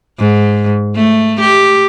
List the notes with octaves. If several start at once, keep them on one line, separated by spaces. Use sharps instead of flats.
G#2
A3
G4